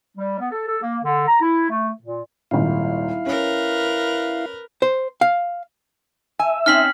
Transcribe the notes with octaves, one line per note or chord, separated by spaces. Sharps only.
G3
B3
A4
A4
A#3
D3
A#5
E4
A3
A#2
D#1 G#1 A#2 E4 F5
C#4 A#4 B4
C5
F5
E5 G#5
C4 C#4 D#4 F6 B6 F#7